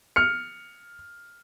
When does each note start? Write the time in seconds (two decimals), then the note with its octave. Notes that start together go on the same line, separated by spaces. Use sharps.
0.16 F6 C#7